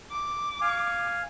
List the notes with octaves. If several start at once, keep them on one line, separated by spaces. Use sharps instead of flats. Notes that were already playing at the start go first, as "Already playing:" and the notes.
D6
F5 G#5